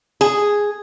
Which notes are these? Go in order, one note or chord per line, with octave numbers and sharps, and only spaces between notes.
G#4